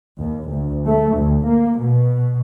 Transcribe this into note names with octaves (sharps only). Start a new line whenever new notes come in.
D#2
D2
A3
D2
A#3
B2